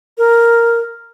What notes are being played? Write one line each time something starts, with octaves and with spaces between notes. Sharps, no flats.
A#4